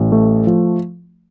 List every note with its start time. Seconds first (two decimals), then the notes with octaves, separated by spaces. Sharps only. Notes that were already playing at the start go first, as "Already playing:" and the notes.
Already playing: A1
0.12 A3
0.47 F3